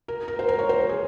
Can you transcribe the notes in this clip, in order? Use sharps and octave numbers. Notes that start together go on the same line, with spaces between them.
A#4
A#4
C5
A#4
C#5
C5
A#4
G#4